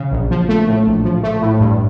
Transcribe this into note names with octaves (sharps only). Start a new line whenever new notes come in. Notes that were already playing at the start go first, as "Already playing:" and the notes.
Already playing: C#3
A#1
F3
A3
A2
A#1
F3
A3
A2
G2